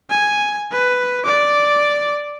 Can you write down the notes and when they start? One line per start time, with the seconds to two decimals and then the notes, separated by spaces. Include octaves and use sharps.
0.10 G#5
0.72 B4
1.24 D5 D6